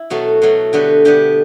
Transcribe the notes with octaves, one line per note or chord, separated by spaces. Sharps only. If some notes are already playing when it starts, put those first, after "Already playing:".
Already playing: E4
B2 F#3 A3 F#4
B2 F#3 A3
D3 G3 B3 F#4
D3 G3 B3 G4